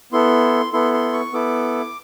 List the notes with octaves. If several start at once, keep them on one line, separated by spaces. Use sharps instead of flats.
B3 E4 A4 C6
B3 E4 A4 C6
C6
C#6
B3 E4 A4 D6